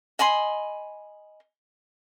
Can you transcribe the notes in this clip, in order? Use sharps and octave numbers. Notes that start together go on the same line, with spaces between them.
D#5 G#5 B5 C6